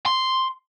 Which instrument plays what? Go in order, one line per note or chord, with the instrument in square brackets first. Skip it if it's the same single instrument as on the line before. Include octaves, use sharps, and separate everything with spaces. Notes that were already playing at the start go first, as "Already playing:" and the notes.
[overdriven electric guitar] C6